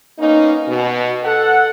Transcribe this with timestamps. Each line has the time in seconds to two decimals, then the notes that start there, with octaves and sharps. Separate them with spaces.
0.18 A#3 B3 C#4 D#4
0.68 B2
1.24 A4 F#5